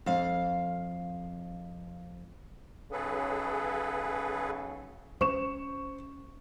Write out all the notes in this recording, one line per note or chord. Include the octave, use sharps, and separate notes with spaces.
F2 F5
B1 C#3 G#4 A4 B4
C#4 C5 C#6 E7